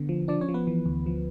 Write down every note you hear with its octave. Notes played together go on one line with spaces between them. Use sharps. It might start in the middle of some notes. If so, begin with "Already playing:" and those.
Already playing: D3 B3
F3
F3 D4 D5
C#4 C#5
F3
B3 B4
E3
D2
F3